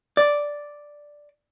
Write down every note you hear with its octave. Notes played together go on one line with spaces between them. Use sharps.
D5